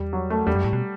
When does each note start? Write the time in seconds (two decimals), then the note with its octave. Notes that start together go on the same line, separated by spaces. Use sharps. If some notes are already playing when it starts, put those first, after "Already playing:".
Already playing: E2 G3
0.13 F#3
0.30 A3
0.47 E2 G3
0.55 F#2
0.64 A2
0.73 B2